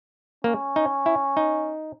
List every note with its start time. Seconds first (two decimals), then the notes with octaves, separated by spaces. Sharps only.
0.44 A#3 C#4
0.76 D#4
1.06 E4
1.37 D#4